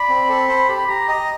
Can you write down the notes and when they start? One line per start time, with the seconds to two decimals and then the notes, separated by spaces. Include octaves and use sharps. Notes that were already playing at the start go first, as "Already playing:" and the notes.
Already playing: D5 B5
0.09 C4
0.29 A4
0.48 C5 B5
0.69 G4 B5
0.89 G4 A#5
1.08 D#5 A#5